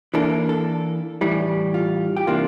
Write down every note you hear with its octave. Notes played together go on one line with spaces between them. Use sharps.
E3 A#3 D4 A4
A4
A2 E3 G3
F4
G4
C3 E3 A#3 D4 F4